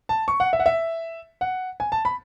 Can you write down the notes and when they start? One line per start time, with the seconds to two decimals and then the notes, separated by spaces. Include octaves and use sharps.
0.09 A5
0.28 C#6
0.40 F#5
0.53 E5
0.60 F#5
0.66 E5
1.41 F#5
1.80 G#5
1.92 A5
2.05 B5